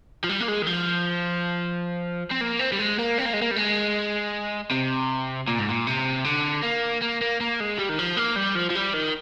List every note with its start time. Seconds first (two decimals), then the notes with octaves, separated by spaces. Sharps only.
0.24 F3
0.29 G3
0.40 A#3
0.48 G#3
0.62 D#3
0.67 F3
2.31 C4
2.41 A#3
2.59 C4
2.72 G3
2.79 G#3
2.98 A#3
3.18 C4
3.25 A#3
3.33 G#3
3.42 A#3
3.51 G3
3.56 G#3
4.71 C3
5.48 A#2
5.59 G#2
5.69 A#2
5.87 C3
6.25 D3
6.63 A#3
7.02 A#3
7.21 A#3
7.40 A#3
7.60 G#3
7.78 G3
7.89 D#3
7.99 F3
8.17 A#3
8.36 G3
8.55 F3
8.70 F3
8.76 G3
8.94 D#3